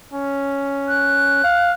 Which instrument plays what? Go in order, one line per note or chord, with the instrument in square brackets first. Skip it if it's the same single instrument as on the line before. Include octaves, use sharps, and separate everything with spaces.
[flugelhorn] C#4
[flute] F#6
[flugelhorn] F5